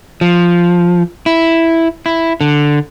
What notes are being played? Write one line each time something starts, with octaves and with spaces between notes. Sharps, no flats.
F3
E4
E4
D3